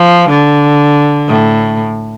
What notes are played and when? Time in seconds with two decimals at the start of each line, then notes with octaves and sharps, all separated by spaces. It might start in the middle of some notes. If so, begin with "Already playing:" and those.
Already playing: F3
0.29 D3
1.28 A2